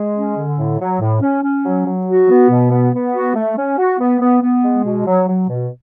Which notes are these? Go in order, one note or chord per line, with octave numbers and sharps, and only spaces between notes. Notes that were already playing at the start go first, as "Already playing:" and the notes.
Already playing: G#3
C#4
D3
A2
F#3
A2
C#4
C#4
F#3
F#3
F#4
B3
B2
B3
B3
F#4
A3
C#4
F#4
B3
B3
B3
G#3
B2
F#3
F#3
B2